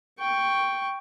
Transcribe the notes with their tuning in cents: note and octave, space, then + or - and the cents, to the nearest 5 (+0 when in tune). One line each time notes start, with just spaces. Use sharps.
G5 +0 C#6 +5